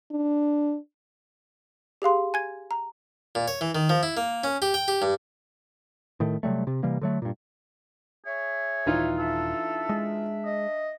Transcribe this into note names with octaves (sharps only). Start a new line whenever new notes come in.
D4
G4 G#4 F5 C6
G#5 G#6
A#5
A#2
C#5
E3
D#3
F3
E4
A#3
C#4
G4
G5
G4
G2
A2 D#3 A3
C3 F#3 G3 A3
C3
C3 E3 G3 A#3
D3 F#3 A3
G2 A#2
G#4 C#5 E5
D#1 E3 D#4 F4
D4 A4 E5
G#3
D#5